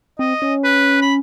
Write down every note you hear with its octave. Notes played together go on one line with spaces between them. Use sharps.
C4 D#5
C#4
B4
B5